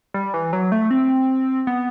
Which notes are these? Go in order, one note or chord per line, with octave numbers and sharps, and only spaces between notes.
G3
E3
F#3
A3
C4
B3